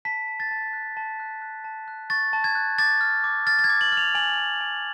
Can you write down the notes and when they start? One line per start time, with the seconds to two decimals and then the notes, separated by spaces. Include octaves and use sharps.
0.05 A5 B6
0.28 A5
0.40 A6
0.51 A5
0.73 F#6
0.97 A5
1.20 F#6
1.42 F#6
1.64 A5
1.88 F#6
2.10 C#6 A6
2.33 A5
2.44 G#6
2.55 F#6
2.78 D6 A6
3.01 F6
3.24 D6
3.46 F6 A6
3.59 A6
3.64 G#6
3.69 D6
3.81 F#7
3.92 F6
3.97 F7
4.15 G#5 F#7
4.38 G#5
4.61 G#5